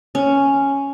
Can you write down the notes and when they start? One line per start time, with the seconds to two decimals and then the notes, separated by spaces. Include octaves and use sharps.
0.15 C#4